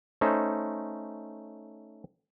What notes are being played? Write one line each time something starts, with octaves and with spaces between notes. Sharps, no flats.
A3 C#4 D#4 C5